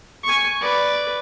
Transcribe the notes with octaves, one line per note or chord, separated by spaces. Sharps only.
G#5 C#6
B4 D5